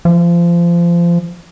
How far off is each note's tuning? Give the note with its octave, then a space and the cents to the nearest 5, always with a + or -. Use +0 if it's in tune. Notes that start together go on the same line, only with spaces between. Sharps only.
F3 -25